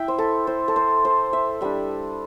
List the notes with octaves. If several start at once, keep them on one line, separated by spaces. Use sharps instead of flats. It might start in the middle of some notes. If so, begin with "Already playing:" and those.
Already playing: E4 E5 G5
C5
A4
C5
A4
C5
C5
E5
G3 D4 E5